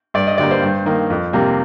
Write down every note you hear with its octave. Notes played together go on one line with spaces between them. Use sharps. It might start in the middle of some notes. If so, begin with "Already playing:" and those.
G2 D5
D#5
D3 G3 A#3 D5
C5
G2
D#3 A#3
F2
C3 G3 A#3